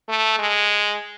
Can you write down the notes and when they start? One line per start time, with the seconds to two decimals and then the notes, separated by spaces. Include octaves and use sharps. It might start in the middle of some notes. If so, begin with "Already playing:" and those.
0.09 A3
0.39 G#3